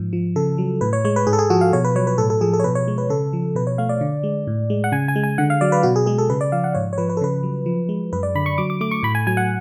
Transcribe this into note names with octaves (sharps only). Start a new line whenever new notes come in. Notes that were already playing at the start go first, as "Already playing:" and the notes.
Already playing: G#2 F3
F3
C#3 A4
F#3
A2 B4
C#5
G#3 C#5
B4
G#2 G#4
A4
G#4
F3 F#4
F5
B2 C#5
B4
F#3 C#5
B4
A2 A4
A4
F3 G#4
A4
C#5
B2 B4
C#5
G#3
B4
C#3 A4
F3
B2 B4
C#5
A3 F5
D5
D3
G#3
A2
G#3
F#5
C#3 G#5
G#5
G#3
G#5
D3 F#5
F5
F#3 D5
B4
B2 F#4
G#4
G#3 G#4
A4
C#3 B4
D5
F3 F5
F#5
G#2 C#5
C#5
F3 B4
B4
A4
C#3 B4
F#3
F3
G#3
F#2 B4
D5
D3 B5
C#6
F#3 D6
D6
A3 D6
C#6
A2 B5
G#5
F#3 G#5
F#5